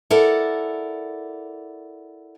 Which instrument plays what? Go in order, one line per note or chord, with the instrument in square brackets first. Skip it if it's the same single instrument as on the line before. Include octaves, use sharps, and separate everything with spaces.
[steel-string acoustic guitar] E4 A4 A#4 D5 F#5